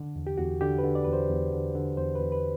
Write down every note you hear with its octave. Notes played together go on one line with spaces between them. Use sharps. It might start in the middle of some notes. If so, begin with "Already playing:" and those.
Already playing: D3
E2
G4
E2 F#4
D3 G4
B4
D3
D5
E2 B4
C5
E2
D3
D3
E2 C5
B4
E2
B4